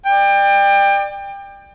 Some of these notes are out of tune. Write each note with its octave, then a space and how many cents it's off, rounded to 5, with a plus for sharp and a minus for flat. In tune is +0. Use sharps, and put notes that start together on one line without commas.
D5 +30 G5 +25